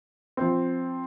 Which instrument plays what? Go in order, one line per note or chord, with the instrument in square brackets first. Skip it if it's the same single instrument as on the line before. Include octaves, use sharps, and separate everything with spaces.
[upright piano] F3 C4